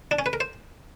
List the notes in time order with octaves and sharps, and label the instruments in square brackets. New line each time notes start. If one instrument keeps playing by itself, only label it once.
[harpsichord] D4
C#4
B4
A#4
C5